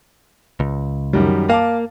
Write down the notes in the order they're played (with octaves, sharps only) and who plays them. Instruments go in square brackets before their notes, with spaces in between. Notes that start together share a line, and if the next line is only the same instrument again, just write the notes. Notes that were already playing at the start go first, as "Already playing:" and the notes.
[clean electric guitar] C#2
[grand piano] F#2 D#3 G3
[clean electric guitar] A#3 [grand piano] F5 A5 D6